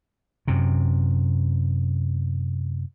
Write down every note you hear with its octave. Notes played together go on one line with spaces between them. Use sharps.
F#2 C3